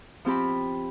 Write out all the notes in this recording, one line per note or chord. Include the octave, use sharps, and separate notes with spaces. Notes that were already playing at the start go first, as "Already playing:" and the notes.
F3 C4 G4 B5